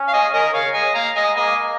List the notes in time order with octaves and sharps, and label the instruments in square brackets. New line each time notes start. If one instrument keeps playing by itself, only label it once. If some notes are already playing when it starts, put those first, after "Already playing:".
Already playing: [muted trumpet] C#4
[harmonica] F5
D#5 G#5
A#4 D#5
C#5 F5
D#5 G#5
F5 A#5
D#5 G#5
[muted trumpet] A#3 [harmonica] D#5 G#5